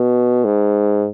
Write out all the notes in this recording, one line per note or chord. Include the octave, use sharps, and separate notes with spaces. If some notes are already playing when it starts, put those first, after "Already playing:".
Already playing: B2
G#2